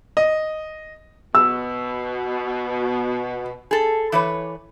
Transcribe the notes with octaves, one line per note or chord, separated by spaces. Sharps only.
D#5
B2 E6
G#4 A4
E3 B4 C#5